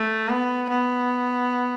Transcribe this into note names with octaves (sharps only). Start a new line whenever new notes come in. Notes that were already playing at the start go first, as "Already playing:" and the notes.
Already playing: A3
B3
B3